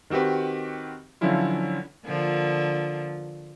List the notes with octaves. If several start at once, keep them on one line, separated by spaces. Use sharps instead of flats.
D#3 C4 F#4 G4 B4
D3 F3 F#3 C#4 E4 F4
D3 F3 A#3